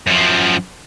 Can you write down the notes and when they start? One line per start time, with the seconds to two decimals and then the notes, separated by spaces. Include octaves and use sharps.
0.07 F#2 F3